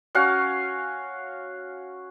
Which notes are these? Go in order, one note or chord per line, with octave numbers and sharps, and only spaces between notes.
C#4 F#4 F5